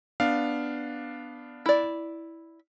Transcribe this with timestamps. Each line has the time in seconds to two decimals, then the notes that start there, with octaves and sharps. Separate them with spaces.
0.20 B3 D4 F5
1.66 E4 D5